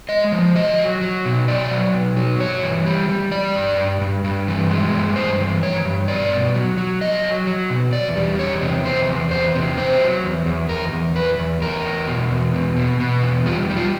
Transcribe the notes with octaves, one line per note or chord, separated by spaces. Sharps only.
G#3 D#5
F3
F#3 D#5
F#3
F#3
B2
F#3 D5
F#3
B2
F#3
G2 C#5
E3
G3
G3
G3 D5
G2
G2
G2
G2
E3
G#3
G2
G2 C5
E3
E3 C#5
G2
B2 D5
B2
F#3
F#3
F#3 D#5
F#3
F#3
B2
E2 D5
G3
E2 C#5
C3
E2 C5
E2
E2 C5
C3
E2 C5
F#3
E2
E2
E2 A#4
E2
E2 B4
E2
E2 A#4
E2
B2
E2
B2
B2
B2
E2
G3 F4
G3
F4